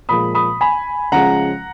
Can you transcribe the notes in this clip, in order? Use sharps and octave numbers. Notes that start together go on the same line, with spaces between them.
A#2 F3 G#3 B5 D#6
B5 D#6
G#5 B5
C#3 F3 G#3 F#5 A#5